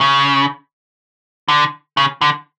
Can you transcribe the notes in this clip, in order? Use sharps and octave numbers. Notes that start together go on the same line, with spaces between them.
C#3
D3
C#3
D3